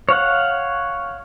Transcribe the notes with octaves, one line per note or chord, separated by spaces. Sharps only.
C#5 F5 F#5